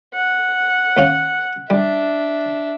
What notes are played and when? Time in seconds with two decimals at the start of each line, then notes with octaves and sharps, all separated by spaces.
0.14 F#5
0.97 D#2 C#4 F5
1.70 G3 D4 E5